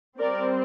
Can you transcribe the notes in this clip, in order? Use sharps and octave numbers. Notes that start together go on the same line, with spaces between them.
G3 C4 A#4 D5